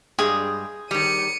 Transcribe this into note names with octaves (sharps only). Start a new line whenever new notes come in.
G2 G3 G#3 G#4
D#3 G3 C#7 D#7